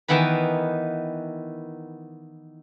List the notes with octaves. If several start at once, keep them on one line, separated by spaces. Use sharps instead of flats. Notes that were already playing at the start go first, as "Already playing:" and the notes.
D#3 E3 B3 D#4 B4